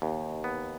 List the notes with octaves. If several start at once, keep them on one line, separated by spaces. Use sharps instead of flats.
D#2
B3